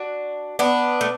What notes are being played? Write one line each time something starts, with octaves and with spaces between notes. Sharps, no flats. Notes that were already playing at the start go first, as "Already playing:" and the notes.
Already playing: D4 F#4
B3 D4
A3